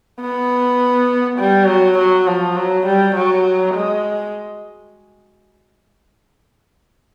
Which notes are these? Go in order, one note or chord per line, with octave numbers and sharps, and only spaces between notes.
B3
G3
F#3
F#3
F3
F#3
G3
F#3
G#3